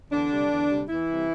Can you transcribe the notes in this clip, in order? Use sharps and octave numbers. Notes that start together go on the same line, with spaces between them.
E2 D3 D4
C3 G3
E2
C3 G3
E2 E3 E4
C3 G3